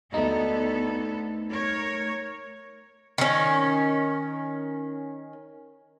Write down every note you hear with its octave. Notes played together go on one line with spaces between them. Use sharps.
D2 A3 B3 D#4 A4
A#4 C#5
D#3 C#4